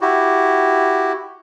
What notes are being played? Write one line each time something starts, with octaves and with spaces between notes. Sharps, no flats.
E4 F#4 G4